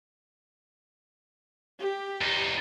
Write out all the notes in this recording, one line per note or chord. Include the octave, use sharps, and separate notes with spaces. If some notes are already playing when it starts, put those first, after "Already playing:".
G4
E2 D#4